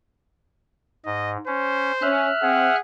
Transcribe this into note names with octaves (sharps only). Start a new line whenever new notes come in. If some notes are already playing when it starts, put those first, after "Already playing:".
G#2 D#5
C#4 C5
C#4 E5 F6 F#6
C4 G#4 F#5